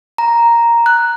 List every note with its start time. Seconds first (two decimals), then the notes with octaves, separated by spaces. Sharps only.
0.18 A#5
0.86 F#6